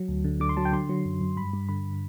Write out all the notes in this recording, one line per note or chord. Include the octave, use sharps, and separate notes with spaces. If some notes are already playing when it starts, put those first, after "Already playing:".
Already playing: F#3
D2
D3
D3 D6
C6
F#3 A5
G5
D3 C6
F#3
F#2
F#2
G2 B5
G2
D3 B5